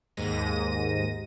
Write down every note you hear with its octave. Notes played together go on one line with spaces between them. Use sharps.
D#2 G#2 A#6 D#7